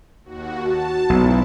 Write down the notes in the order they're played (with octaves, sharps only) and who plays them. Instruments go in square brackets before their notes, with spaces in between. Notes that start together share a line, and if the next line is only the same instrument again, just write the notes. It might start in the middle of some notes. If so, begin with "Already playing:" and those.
[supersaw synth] D#2 F#4
[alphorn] F#4 [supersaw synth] A5
[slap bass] B1 [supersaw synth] G#2 E4